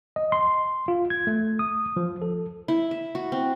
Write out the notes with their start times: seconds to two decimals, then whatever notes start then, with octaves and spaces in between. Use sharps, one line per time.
0.16 D#5
0.32 C6
0.88 F4
1.10 G#6
1.27 A3
1.59 D#6
1.96 F3
2.22 A4
2.68 E4
2.91 E5
3.15 F#4
3.32 C4